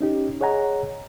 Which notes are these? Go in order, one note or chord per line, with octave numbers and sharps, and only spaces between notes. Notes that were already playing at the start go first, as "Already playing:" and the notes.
C#4 D#4 G4
G#4 C#5 D#5 F#5 G#5 A#5